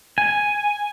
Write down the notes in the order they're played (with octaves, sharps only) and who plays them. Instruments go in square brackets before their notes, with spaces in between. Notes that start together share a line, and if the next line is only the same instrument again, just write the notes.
[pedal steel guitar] G#5